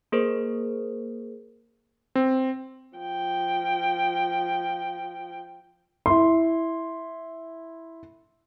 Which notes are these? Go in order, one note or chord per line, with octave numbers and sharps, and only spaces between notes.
A#3 G#4 A#4 C5
C4
F3 G5
E4 C6